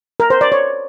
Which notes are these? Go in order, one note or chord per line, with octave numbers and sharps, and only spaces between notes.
A#4
C5
D5
C#5